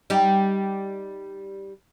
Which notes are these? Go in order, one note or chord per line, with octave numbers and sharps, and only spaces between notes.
G3 D#4 G4